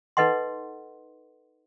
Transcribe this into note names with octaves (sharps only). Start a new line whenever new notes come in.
D#4 A4 B4 D#5 F#5 C6